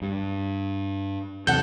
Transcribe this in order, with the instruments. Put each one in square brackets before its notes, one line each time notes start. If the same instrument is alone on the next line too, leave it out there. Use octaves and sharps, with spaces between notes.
[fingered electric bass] G2
[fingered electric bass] E2 C3 F#3 [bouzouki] A4 F#5 [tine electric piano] G6